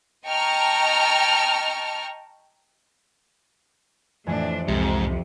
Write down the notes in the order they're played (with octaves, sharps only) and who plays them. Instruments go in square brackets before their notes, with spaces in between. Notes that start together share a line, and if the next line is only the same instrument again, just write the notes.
[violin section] D#5 G5 A5 A#5 C#6 F6
[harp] F2 E3 G#5 [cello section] A2 D4
[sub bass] C2 [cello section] F2 C3 [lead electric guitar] G#2 [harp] G4